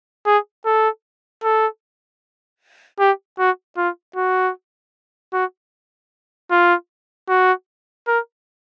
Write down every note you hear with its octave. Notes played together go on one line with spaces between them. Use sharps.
G#4
A4
A4
G4
F#4
F4
F#4
F#4
F4
F#4
A#4